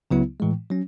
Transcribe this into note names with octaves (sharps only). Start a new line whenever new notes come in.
C#2 C#3 F#3 B3 E4
A2 E3 G#3
F#3 C#4